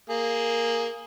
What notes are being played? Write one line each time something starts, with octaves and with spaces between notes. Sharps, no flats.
A#3 G#4